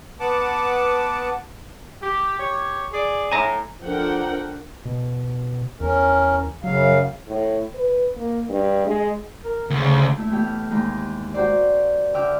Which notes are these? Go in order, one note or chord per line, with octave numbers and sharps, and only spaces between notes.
B3 B4 F#5 A5 D6
G4
G4 C#5
G#4 D5
A2 G#5 A#5
F3 D4 A4 A#4 F#5 G5
B2
E2 C#4 A#4
F#2 C#3 F#3 F5
A2
B4
A#3
G2
G#3
A#4
D2 C#3
A3 E4
A2 E3 A3 B3 G4 F6
D#2 E3 G#3
F#4 G4 A#4 C5 D5
D3 E5 G5 D6 F6